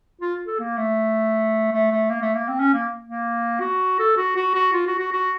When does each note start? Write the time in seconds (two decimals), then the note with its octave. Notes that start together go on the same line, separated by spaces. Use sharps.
0.21 F4
0.47 A4
0.59 A#3
0.78 A3
1.72 A3
1.91 A3
2.10 A#3
2.22 A3
2.35 A#3
2.48 C4
2.60 C#4
2.74 A#3
3.05 A#3
3.60 F#4
3.99 A4
4.17 F#4
4.36 F#4
4.55 F#4
4.73 F4
4.87 F#4
4.99 F#4
5.12 F#4